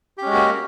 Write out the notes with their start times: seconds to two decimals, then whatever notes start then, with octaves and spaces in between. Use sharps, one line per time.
0.18 G4
0.22 C#4
0.26 G#3
0.30 F#4
0.34 A#3